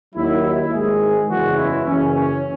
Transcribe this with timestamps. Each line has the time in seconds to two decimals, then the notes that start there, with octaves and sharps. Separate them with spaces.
0.15 D#2 D#3 F#3 E4
0.44 E4
0.72 G#1 G#2 D#3 G#3 G#4
1.28 F#1 E2 C#3 E3 G#3 F#4
1.57 E4
1.84 F#1 F#2 C#3 E3 C#4
2.13 C#4